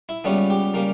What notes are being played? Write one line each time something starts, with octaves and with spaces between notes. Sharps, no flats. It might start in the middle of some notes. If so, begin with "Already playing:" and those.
E4
C#2 C#3 G3 B3 C#4
G4
C#3 G3 A#3